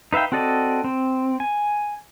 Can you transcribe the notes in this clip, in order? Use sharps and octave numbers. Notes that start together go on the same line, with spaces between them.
D#4 B4 E5 F5 G5
C4 F#4 A4 D5 D#5
C4
G#5